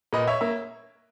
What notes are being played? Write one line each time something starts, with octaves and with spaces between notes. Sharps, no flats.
A#2 B4 D#5
C#5 E5
A#3 E5